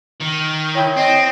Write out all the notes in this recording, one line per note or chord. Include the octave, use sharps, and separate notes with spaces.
D#3
E4 C#5 G5
C4 D#5